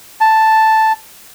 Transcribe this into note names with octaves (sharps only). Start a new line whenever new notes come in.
A5